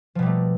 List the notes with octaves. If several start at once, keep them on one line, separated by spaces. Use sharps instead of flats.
B2 F3 G3 A3 A#3